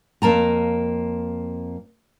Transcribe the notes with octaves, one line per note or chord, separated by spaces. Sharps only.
F2 A#3 A5 A#5